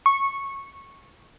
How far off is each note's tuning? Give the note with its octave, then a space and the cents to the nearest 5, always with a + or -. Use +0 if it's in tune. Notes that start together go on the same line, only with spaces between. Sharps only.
C#6 -15